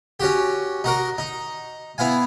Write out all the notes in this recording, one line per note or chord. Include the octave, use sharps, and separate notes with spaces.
C#4 F#4 G4
D#4 F#4 A#4
D#4
B3 E4 F5 G#5